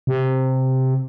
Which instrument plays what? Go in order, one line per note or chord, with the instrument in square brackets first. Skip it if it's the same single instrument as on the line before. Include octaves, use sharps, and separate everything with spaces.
[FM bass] C3